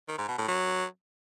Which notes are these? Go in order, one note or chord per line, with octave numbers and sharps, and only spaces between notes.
D#3
G#2
B2
A2
F#3